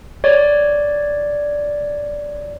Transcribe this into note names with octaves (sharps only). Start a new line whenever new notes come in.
C#5 D5